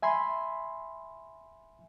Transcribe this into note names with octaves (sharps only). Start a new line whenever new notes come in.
E5 G#5 B5 C6